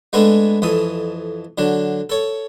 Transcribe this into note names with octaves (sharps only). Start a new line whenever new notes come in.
G#3 A3 B3 D4 G#4 A4
F2 E3 A4 D#6
D3 F#3 D4
A4 C#5